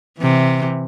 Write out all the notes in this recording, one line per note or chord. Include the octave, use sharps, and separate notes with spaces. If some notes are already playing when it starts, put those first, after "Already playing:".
C3 E3